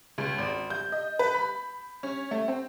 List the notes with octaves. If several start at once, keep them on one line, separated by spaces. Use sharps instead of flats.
C#2
G#1
G6
D#5
B4
B5
C#4
A3
C4